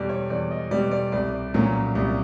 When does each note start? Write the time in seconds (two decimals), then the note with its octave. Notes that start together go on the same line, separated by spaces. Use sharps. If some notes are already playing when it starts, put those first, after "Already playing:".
Already playing: E2 B2 G3 D5
0.09 C#5
0.30 E2 D5
0.51 D#5
0.71 B2 G3 D5
0.91 D5
1.12 C2 D5
1.54 A#2 F#3 A#3 C#4
1.95 C2